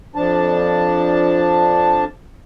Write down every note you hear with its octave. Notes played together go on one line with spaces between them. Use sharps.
F2 F3 D4 A5